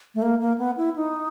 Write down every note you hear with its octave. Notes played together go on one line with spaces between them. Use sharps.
A3
A#3
A#3
B3
E4
D#4